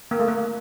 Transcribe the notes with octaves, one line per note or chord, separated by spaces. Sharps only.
A#3
A3
A#3